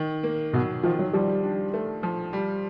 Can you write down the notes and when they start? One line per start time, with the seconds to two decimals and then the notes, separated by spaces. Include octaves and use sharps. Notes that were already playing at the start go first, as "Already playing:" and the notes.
Already playing: D#3
0.23 A#3
0.53 B2 F#3
0.83 D#3 F3
0.99 F#3
1.13 F3 G3
1.43 D4
1.74 A3
2.03 F3
2.33 G3